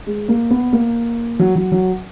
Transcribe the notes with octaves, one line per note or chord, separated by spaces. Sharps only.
G#3
A#3
B3
A#3
F#3
F#3
F#3